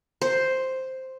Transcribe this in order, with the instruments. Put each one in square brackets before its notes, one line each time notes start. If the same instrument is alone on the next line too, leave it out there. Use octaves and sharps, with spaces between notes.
[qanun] C5